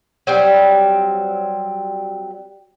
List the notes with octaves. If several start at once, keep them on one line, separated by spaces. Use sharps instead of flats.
F#3 G3 C4